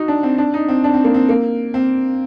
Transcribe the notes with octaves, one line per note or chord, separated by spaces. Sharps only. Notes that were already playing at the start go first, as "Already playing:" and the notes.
Already playing: D#4 F#4
D4
C4
D4
D#4
C4
D4
C4
A#3
C4
A#3
C4